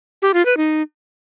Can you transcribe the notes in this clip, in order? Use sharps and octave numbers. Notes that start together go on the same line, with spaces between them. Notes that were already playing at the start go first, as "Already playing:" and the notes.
G4
F4
B4
D#4